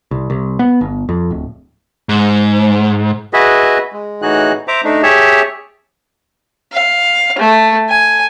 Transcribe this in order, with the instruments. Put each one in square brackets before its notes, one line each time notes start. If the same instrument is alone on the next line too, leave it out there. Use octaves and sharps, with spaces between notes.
[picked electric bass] C2
C2
B3
G1
F2
D1
[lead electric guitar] G#2
[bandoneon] F#4 G#4 B4 D#5 E5
G#3
A2 E3 D#4 F#4 G#4 F#6
C5 E5 A#5 D6
A3 D4 D#4
G4 G#4 C#5 E5 A5
[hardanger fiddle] F5
A3
G#5